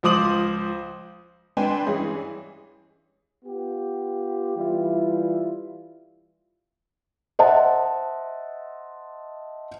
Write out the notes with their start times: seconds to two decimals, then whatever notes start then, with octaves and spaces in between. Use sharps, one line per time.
0.03 C#2 F3 C5 D6 D#6 F#7
1.57 C4 D4 B4 G5 G#5 C6
1.87 G2 E3 G#3 C#4 G#4
3.45 B3 F4 G4
4.57 E3 G3 E4 F4
7.39 C5 D#5 E5 F#5 A5